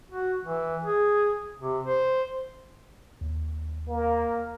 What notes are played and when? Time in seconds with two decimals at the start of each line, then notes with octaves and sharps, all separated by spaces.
0.11 F#4
0.45 E3
0.85 G#4
1.60 C3
1.86 C5
3.21 D#2
3.89 A#3